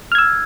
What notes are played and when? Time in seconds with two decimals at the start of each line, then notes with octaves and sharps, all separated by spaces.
0.12 F6
0.15 G#6
0.18 E6